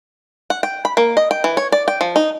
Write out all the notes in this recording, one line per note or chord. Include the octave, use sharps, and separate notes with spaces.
F#5
G5
B5
A#3
D#5
G5
E3
C#5
D5
G5
F3
D#4